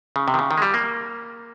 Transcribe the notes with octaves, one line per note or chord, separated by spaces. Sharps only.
C#3
C3
D#3
C#3
D#3
G#3
G3
A#3